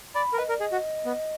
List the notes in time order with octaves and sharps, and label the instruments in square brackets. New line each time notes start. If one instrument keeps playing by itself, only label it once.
[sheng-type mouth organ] D5 [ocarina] B5
[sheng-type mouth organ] A#4
[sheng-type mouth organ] B4 [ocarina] D#5
[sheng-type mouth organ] A#4 [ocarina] D5
[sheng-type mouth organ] G#4 [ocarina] D#5
[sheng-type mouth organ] F#4
B3